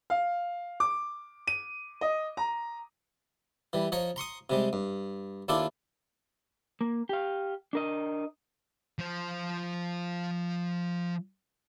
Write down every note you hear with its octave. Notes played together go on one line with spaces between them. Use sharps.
F5
D6
D#7
D#5
A#5
E3 G3
F3 C#5 D#5 A#5
A#5 C6 C#6 D#6
C3 G3 G#3
G2
D#2 D4 E4 F4 A4 D6
A#3
G4 F5
D4 A#4 D#5
F3 C5